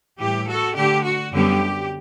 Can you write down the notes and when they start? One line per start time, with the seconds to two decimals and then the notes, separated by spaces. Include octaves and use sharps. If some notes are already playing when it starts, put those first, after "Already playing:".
0.18 A2 E3 G3 G4
0.47 F#4 A4
0.75 D3 A3 D4 G4
1.05 F#4
1.33 F#2 D3 G3 B3 G4